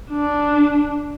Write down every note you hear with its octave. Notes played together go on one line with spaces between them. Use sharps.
D4